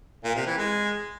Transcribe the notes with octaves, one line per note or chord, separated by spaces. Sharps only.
A#2
C3
E3
G#3